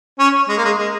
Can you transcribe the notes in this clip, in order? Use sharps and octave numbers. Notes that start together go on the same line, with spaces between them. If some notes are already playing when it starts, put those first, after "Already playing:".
C#4
G#3
A#3
G#3
G#3